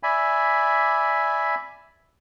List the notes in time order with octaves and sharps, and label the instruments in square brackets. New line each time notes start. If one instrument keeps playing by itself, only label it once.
[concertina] D5 E5 G#5 B5